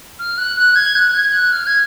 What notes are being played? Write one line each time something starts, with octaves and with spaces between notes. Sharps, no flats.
F6
F#6
F#6
G#6
F#6
G#6
F#6
F6
G#6